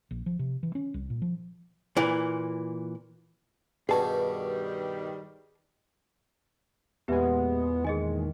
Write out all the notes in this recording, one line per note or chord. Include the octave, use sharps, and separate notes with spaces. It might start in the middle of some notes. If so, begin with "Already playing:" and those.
A#1
F3
C3
E3
C#4
C2
A#2
F3
A#2 E3
G2 B2 D#3 G3 F#4 G#4 A5
E2 A#2 G#3 B3 G4 B4 E5
D#3 G#4 D#5 G#5